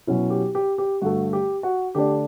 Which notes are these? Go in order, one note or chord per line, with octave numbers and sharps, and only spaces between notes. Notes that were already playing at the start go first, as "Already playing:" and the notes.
B2 F#3 C#4 E4
G4
G4
G4
G2 D3 A3 F#4
G4
F#4
D3 A3 D4 G4